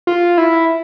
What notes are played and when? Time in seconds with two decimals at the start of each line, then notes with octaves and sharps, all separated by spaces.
0.07 F4
0.38 E4